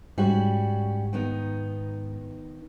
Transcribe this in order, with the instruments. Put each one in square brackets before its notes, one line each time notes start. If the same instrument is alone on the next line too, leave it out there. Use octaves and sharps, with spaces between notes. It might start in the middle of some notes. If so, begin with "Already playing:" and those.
[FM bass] G#2 [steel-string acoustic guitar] G3 C#4 F#4
[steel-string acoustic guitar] D#3 B3 D#4